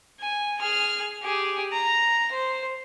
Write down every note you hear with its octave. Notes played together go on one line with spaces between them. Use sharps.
G#5
G#4 F6
G4 G#4
A#5
C5